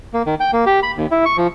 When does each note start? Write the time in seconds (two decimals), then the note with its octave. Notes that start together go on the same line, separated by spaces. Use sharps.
0.14 A#3
0.26 D#3
0.40 G5
0.53 A#3
0.66 G4
0.83 B5
0.97 D#2
1.11 E4
1.25 C#6
1.37 F3